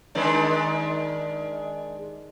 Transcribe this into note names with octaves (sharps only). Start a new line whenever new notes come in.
D#3 G#3 D4